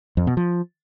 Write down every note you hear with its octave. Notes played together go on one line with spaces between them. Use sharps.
F2
B2
F3